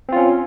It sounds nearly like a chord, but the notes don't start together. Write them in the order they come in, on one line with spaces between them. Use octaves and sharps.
C4 F4 C#4